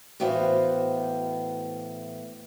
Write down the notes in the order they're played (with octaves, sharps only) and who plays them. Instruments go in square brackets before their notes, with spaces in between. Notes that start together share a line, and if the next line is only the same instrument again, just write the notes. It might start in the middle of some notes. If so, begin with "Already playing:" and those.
[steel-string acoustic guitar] A2 E3 B3 F#4 C5 F5